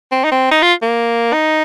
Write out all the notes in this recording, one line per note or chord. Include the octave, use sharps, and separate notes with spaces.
C4
D#4
C4
D#4
F4
A#3
D#4